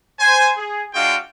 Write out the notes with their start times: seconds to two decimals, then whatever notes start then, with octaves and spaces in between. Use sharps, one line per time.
0.20 C5 G#5
0.57 G#4
0.94 G#3 D4 F4 F#4 F5 G5